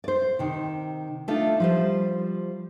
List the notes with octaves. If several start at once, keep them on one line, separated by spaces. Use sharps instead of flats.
C5 D5
C3 D#3
A3 D4 D#4 F4
F3 G3 C5